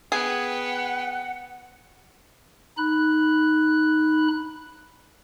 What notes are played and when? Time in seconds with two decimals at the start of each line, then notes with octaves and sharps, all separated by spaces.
0.12 B3 G#4 F#5 G5
2.77 D#4 B5 F#6